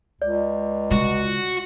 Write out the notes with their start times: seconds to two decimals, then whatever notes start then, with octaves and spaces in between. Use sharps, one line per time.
0.22 C#2 D5
0.91 C#3 G#3 F#4